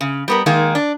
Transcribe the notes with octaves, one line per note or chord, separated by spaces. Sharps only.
C#3
G3 B3 A#4
D#3 G#3 A#3 D#4 G#4
D4